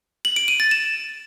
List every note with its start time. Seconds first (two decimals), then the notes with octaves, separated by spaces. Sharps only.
0.25 F#7
0.36 D7
0.48 D#7
0.60 A6
0.71 E7